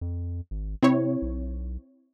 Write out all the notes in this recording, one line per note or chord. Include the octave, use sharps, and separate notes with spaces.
F2
G#1
C3 C4 E4 C#5
B1